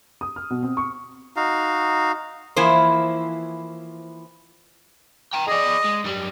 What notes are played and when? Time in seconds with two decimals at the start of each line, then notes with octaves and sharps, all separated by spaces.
0.21 D#6
0.36 F6
0.50 B2
0.63 C4
0.77 C#6
1.36 D#4 F#4 F5
2.56 E3 F3 A#3 E4 C5
5.34 G5 A#5
5.48 G#4 D5 D#5
5.85 G#3
6.04 F#2 G3